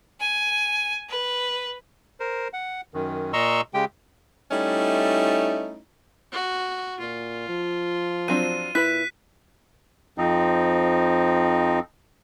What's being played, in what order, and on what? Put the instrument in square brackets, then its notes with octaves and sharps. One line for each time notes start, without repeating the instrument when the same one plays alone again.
[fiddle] G#5
B4
[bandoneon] A#4 C5
F#5
F#2 D#3
A#2 D#5 A#5 C6 C#6 E6
C#3 G#3 G4 G5
[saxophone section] G3 A3 C#4 D#4 E4
[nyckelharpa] F#4
[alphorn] A#2 [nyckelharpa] F4
[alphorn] F3
[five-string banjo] F#3 C4 D4 [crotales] D#7
[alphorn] A#2 [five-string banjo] E4 B4 [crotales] F#6 B6
[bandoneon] F2 F3 C4 D#4